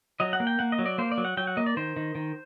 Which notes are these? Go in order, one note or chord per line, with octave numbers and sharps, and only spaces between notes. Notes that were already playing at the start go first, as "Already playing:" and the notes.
F#3 D#5
F#5
A#3
G5
A#3 F#5
D#5
F#3
D5
A#3 C5
D5
F#3
F#5
F#3 G5
F#5
A#3 D#5
D5
D#3 C5
D#3
D#3